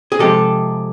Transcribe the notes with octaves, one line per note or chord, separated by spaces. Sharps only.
G#4
C3 F3 G#3 G4 A4